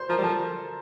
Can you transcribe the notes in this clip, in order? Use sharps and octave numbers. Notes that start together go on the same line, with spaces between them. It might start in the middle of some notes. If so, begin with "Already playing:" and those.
Already playing: C5 C6
F3 A#4 A#5
G3
F3 A4 A5